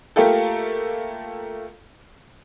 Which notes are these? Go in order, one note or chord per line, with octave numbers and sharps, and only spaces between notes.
A3 A#3 F4 G4 A4